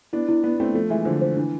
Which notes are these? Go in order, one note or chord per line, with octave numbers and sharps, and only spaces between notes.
B3 D4 E4
E4
B3 D4 E4
A3 C4 E4
F3 A3 A4
E3 G#3 E5
D3 F3 C5
C5
E3 D4